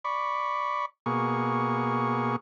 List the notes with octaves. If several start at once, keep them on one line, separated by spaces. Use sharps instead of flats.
D5 B5 C#6
B2 A#3 G#4 C#6